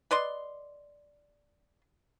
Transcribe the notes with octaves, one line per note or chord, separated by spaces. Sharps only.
B4 D5 D#5 C6